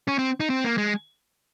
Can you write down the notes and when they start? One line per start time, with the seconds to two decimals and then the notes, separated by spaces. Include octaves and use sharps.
0.08 C#4
0.18 C4
0.40 D#4
0.50 C4
0.64 A#3
0.78 G#3